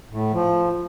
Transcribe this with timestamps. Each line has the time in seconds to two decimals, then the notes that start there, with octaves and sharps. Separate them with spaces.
0.10 A2
0.33 F3